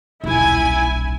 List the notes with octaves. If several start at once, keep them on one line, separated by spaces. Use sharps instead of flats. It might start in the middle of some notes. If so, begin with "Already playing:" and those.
D#1 B1 E4 G#5